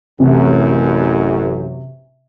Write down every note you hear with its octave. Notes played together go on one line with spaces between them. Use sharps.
A1 F#2 C3